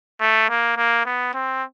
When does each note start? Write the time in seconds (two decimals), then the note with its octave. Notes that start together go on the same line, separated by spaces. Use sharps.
0.21 A3
0.49 A#3
0.77 A#3
1.05 B3
1.34 C4